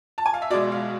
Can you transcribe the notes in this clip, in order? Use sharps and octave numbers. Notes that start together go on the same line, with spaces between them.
A5
G#5
F5
E5
B2 G#3 D5
F5